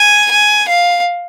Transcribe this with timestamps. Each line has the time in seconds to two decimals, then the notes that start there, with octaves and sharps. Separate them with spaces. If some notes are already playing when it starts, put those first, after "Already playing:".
Already playing: G#5
0.31 G#5
0.68 F5